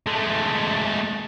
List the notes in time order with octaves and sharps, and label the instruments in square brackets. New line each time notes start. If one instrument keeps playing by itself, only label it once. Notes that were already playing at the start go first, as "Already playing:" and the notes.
[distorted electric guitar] G#3 A3